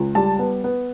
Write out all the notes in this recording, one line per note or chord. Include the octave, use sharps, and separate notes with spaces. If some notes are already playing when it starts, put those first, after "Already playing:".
Already playing: C#2
G3 A5
B3
B3